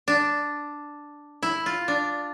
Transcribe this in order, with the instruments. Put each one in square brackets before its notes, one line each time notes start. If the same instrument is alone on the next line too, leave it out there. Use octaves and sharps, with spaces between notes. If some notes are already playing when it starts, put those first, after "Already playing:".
[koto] D4
E4
F4
D4